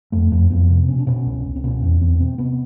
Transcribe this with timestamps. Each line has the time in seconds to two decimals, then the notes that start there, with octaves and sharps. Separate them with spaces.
0.12 F2 A3
0.32 F2
0.50 F2 B3
0.69 C3
0.88 B2 C#4
0.99 D4
1.07 B2 C#4
1.26 C#2
1.44 C#2
1.56 C4
1.64 B2 C#4
1.82 E2
2.01 E2 C4
2.20 B2 C4
2.38 C3 B3